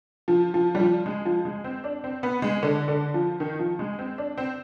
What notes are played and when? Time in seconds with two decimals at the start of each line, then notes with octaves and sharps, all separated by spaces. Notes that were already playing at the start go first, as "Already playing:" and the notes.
0.28 F3
0.54 F3
0.75 G3
0.80 F3
1.06 G#3
1.25 F3
1.45 G#3
1.64 C4
1.84 D4
2.04 C4
2.23 B3
2.42 G#3
2.63 D3
2.88 D3
3.14 F3
3.40 D#3
3.59 F3
3.79 G#3
3.99 C4
4.18 D4
4.37 C4